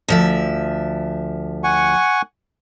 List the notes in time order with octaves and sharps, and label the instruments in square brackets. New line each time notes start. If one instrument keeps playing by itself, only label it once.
[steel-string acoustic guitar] D2 F3 E5
[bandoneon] F#5 G#5 C#6